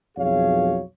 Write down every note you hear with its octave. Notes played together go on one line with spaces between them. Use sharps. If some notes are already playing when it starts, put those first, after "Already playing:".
B1 F2 F#3 G#4 C#5 F5